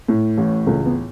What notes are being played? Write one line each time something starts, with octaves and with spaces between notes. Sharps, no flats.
A2
A1
C#2 A3
B3